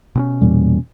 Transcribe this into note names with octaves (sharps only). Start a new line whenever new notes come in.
B2 C4 C#4
E2 A#2 G3